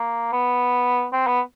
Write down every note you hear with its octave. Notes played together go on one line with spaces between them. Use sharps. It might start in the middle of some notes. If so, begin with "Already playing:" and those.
Already playing: A#3
B3
C4
B3